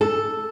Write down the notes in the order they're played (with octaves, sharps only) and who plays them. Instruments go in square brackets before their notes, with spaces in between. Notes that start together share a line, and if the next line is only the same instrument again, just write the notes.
[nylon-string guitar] A4